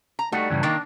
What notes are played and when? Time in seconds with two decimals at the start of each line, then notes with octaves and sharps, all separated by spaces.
0.19 A#5
0.32 G3 A3 D#4 F#4
0.50 G2 C#3 E3
0.63 D#3 A#3 D4